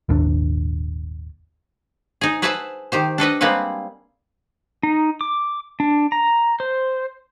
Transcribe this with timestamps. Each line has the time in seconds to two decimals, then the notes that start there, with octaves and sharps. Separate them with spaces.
0.09 D#1 G#1 D#2 D4
2.21 D#4 G#4
2.42 G#4 B4 C5 E5 F#5 A5
2.92 D#3 G4 C5
3.18 D4 A4 B4 D#5
3.41 G3 G#3 A#3 C4 B4 F#5
4.83 D#4
5.21 D6
5.80 D4
6.12 A#5
6.60 C5